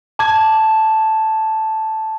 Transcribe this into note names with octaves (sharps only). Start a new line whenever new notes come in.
A5 D6 G#6